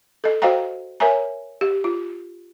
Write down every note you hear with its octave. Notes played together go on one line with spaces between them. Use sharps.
A4 D#5
F#4 C5 D#5 F5 G5 A#5
A#4 C#5 E5 G#5 A#5
G4
F4